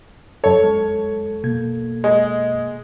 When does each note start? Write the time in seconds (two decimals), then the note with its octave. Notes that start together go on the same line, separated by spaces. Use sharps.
0.44 F#2 A4 C#5
0.63 G#3
1.44 B2 A#3 G#6
2.04 G#3